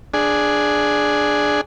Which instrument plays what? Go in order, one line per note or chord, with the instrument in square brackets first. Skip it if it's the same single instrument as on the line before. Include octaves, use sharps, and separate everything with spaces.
[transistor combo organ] D4 G#4